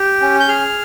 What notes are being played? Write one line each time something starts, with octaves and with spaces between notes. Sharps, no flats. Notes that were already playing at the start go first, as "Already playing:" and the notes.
Already playing: G4
C#4
G6
G#4 F6